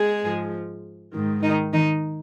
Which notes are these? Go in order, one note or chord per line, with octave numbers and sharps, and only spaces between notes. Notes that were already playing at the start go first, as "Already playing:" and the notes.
Already playing: G#3 G#4
G#2 F3
G#2 D#3
D#3 D#4
D#3 D#4